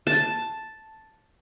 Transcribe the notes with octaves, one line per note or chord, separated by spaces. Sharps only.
A5